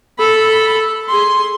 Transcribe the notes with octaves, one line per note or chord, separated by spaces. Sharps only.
A4 B5
G#4 C6